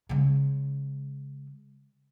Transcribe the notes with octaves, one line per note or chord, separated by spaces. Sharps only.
C#3 G#3